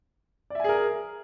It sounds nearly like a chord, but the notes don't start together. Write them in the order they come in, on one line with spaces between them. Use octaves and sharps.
D5 E5 G#5 G#4 A#4